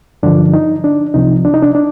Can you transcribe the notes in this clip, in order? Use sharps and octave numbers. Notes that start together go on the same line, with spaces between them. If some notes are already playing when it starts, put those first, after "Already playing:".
G2 D3 F3 D4
D#4
D4
C2 C3 F3 D#4
D4
D#4
D4
D4